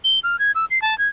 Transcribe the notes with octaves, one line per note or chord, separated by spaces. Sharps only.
G7
F6
G#6
E6
C7
A5
G#6